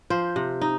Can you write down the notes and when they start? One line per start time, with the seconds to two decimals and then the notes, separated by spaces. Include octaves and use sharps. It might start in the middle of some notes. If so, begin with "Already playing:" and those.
0.10 F3 C5
0.36 C3
0.62 D#4